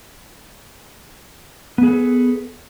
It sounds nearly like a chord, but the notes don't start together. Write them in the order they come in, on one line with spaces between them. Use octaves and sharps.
B3 G#4 A4 B4